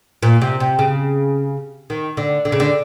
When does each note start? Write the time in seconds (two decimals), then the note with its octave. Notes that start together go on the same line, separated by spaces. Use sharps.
0.23 A#2
0.42 C3
0.60 C3
0.79 C#3
1.90 D#3
2.17 D3
2.45 D3
2.52 C#3
2.60 D3